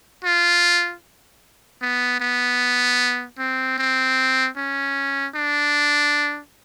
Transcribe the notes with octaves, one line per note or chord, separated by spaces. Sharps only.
F4
B3
B3
C4
C4
C#4
D4